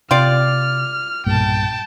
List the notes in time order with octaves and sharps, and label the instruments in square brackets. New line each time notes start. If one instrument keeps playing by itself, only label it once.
[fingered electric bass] C3 [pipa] F4 G4 D5 [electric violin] F6
[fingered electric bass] B1 G2 A#2 [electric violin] G5 A5